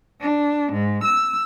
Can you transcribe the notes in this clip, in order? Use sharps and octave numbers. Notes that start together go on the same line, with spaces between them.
D4
G#2
E6